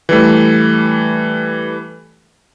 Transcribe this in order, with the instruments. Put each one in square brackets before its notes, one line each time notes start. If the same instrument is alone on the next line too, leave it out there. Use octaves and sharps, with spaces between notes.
[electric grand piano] E3 G3 A3